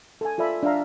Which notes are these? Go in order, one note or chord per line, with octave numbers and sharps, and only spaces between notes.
A4 G#5
F4 A4 D5 E5 B5
D4 E5 F5 A#5